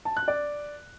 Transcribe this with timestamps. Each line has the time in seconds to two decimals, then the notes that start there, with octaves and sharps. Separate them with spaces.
0.05 A5
0.17 F#6
0.28 D5